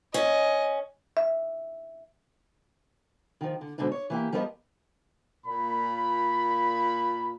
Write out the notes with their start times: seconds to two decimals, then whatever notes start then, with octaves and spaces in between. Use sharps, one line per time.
0.14 C#4 D#5
1.17 E5
3.41 D#3 F3
3.61 D3
3.78 G#2 B2 D3 D4 D#4
3.92 C#5
4.10 E3 A#3 G4
4.33 F3 G3 B3 A#4 C#5 D#5
5.46 A#2 B5